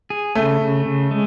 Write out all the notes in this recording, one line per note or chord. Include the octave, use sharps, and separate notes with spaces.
G#4
C#3 A3
C#3
C#3
G#3